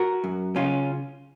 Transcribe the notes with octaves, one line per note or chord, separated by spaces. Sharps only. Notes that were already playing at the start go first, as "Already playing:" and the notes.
Already playing: F#4 A#4
F#2
C#3 C#4 F4